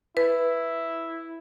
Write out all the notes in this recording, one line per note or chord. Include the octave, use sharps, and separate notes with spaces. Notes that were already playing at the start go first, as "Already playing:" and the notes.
E4 B4